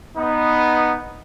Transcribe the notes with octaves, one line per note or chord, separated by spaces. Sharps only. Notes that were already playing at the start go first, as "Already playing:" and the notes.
B3 D#4